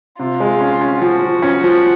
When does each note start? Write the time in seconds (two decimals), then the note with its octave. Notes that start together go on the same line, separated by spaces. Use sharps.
0.19 C3 F4
0.40 G#3
0.61 C#4
0.81 C#4
1.01 F3 F#4
1.22 F3
1.42 C#4
1.63 F3